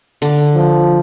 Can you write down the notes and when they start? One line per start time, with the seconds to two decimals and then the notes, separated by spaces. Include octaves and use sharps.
0.22 D3 D6
0.55 F3